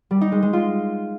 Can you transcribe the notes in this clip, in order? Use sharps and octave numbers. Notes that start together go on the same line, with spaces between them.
G3
D#4
G#3
G#3
F4